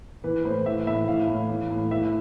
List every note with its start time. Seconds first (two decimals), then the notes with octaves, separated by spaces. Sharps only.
0.24 E3 B4
0.45 A2 C5
0.66 E3 E5
0.87 A2 E5
1.08 E3 F5
1.28 A2
1.49 E3
1.70 A2
1.91 E3 E5